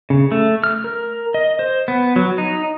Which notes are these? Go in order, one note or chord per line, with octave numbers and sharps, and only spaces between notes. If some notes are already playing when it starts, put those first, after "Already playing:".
C#3
A3
F6
A#4
D#5
C5
B3
F#3
D#4